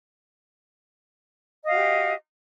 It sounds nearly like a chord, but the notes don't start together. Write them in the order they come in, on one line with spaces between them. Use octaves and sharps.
D#5 F5 F#4 G4